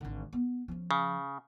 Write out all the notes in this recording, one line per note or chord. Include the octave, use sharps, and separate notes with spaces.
G#1 D3
B3
F3 C#4
C#3